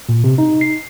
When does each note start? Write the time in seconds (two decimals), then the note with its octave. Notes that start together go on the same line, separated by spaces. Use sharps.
0.09 A#2
0.24 C3
0.38 D#4
0.61 C7